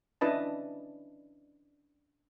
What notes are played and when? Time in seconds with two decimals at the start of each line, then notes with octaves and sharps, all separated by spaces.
0.21 C#4 D4 E4 B4 D#5 A5